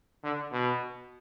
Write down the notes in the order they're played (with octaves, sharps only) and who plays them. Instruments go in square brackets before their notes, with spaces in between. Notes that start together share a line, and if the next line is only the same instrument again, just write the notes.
[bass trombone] D3
B2